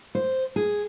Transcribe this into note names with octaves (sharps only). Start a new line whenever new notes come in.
C5
G#4